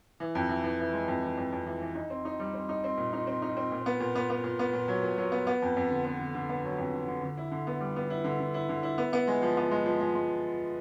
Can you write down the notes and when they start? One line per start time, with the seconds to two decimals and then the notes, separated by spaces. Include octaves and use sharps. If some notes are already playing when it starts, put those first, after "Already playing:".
0.20 E3
0.35 F2
0.49 E3
0.63 E3
0.79 E3
0.94 G#3
1.08 F2
1.23 E3
1.37 F2
1.52 F2
1.66 E3
1.82 E3
1.95 D#4
2.10 C4
2.25 D#4
2.40 G3
2.54 C4
2.69 D#4
2.84 C4
2.98 A#2
3.13 D#4
3.27 C4
3.42 D#4
3.57 C4
3.72 A#2
3.86 B3
4.00 A#2
4.15 B3
4.30 B3
4.44 A#2
4.59 B3
4.73 A#2
4.88 F#3
5.03 A#2
5.18 F#3
5.32 B3
5.47 B3
5.62 F2
5.77 F2
5.90 D3
6.05 B3
6.19 D3
6.35 D3
6.49 B3
6.64 F#3
6.78 F2
6.94 D3
7.08 D3
7.22 D3
7.37 E4
7.52 D3
7.67 B3
7.81 G3
7.96 B3
8.10 E4
8.24 D3
8.40 D3
8.54 E4
8.69 D3
8.83 E4
8.98 B3
9.13 B3
9.28 G#3
9.42 F3
9.57 B3
9.71 G#3
9.86 F3
10.00 G#3
10.15 G#3